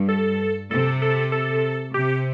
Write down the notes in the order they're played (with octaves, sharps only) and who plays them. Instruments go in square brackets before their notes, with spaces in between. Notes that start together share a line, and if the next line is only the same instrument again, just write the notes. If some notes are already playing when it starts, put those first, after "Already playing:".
Already playing: [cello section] G2
[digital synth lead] A4
[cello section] C3 [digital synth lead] A4
[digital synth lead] A4
A4
[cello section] C3 [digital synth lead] G4